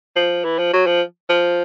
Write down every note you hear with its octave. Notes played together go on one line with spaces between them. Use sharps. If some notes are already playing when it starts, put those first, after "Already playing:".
F3
E3
F3
F#3
F3
F3